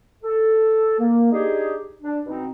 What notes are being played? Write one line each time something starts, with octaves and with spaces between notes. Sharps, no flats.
A4
A#3
D4 D#4 G4 G#4
D4
B2 C4 D#4